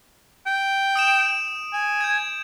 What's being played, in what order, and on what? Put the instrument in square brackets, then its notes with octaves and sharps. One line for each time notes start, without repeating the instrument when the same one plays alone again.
[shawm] G5
[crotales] D#6 D7 E7
[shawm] G#5
[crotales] G6 G#6